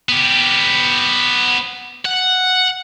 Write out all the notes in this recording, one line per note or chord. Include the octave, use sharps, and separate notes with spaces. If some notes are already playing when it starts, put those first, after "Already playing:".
B3 G4
F#5